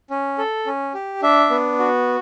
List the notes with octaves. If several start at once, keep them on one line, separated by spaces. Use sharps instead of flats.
C#4
A4
C#4
G4
D4 E5
B3
F#4